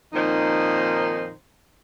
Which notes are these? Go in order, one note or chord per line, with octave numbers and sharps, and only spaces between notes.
F2 A#2 D#3 D#4 C5